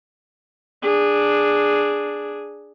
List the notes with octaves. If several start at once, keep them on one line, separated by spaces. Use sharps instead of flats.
D4 G#4